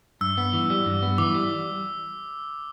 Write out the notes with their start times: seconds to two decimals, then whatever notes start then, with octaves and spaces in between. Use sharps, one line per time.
0.21 G2 E6
0.38 B3
0.53 E3
0.70 G3
0.86 G2
1.02 B3
1.18 E3 D6
1.35 G3